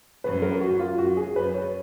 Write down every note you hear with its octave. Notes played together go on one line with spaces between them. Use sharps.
F#2 B4
A#4
F#4
F4
F#2 F#4
G#4
F#2 B4
C#5